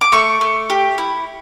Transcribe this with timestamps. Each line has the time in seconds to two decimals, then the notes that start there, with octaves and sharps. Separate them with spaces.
0.01 D6
0.12 A3 C#6
0.41 A3
0.70 G4
0.98 E4